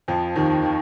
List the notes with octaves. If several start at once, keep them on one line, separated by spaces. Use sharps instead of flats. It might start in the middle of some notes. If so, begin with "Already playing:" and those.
F2 F3
D#2 D#3
D#3